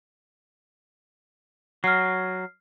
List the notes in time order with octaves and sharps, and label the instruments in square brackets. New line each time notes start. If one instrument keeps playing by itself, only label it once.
[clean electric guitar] F#3 [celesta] F6 C7